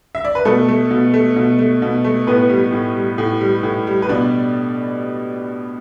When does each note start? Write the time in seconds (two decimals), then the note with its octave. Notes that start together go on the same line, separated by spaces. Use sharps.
0.15 E5
0.25 D5
0.35 B4
0.45 B2 A3 A4
0.68 A3
0.91 B2
1.14 A3
1.36 B2
1.59 A3
1.82 B2
2.04 A3
2.27 A2 B3 B4
2.50 G3
2.72 A2
2.96 G3
3.18 A2
3.41 G3
3.63 A2
3.87 G3
4.02 B4
4.09 B2 D4 D5